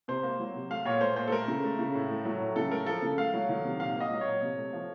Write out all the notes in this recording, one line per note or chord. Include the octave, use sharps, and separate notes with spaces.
C3 C5
A#3
F#3
C3
A3 F5
A#2 C#5
A3 C5
A#2 C5
A4
A3 A#4
C#3
A3
C#3
A2
A3
F#3
A2
C#3 A4
A3 A#4
F3 A4
C#3
A3 F5
F#3
D#3
C3
A#2 F5
A#3 D#5
F#3
C#5
A#2
C3
A3
F3